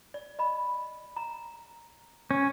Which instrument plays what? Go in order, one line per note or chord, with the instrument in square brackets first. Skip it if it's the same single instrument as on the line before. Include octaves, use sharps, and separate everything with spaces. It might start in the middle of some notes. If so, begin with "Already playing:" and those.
[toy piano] D5
D#5 B5
A#5
[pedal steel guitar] C#4